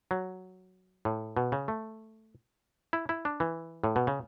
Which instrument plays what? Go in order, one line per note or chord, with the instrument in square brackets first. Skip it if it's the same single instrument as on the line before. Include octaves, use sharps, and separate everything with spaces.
[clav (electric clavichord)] F#3
A2
B2
C#3
A3
E4
E4
D4
E3
A2
B2
C#3